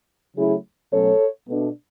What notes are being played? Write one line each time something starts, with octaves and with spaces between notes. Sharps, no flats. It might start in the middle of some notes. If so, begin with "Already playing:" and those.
C#3 F#3 A3 C#4 E4 G#4
B2 F#3 A3 C#4 A4 C#5
B2 A3 D4